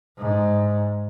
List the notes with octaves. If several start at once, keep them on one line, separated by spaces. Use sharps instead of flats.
G#2